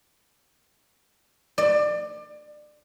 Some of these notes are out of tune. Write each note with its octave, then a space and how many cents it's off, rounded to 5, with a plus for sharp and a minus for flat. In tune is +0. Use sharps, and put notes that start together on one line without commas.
D5 +25